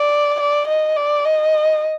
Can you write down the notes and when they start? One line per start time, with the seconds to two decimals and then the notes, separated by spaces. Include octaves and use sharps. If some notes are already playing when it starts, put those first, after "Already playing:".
Already playing: D5
0.40 D5
0.68 D#5
0.96 D5
1.25 D#5